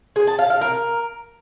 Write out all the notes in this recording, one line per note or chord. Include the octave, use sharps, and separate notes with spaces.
G#4
A5
F5
F5
A#4